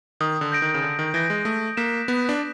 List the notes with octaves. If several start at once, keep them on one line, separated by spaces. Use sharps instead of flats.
D#3 D#6
D3
G6 A#6 D7
D#3
C#3
D3 D#6
D#3
E3 G6 A#6 D7
G#3
A3 D#6
A#3 F#6 B6 E7
B3 D#6
D4